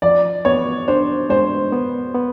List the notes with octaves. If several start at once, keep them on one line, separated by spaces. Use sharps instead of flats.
F3 D5
B3 C#5
D4 C5
G#3 C5
B3
B3